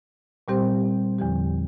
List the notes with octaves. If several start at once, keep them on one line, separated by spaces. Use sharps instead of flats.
A#2 G3 C4 G4 C5
E2 D3 F3 C4 G4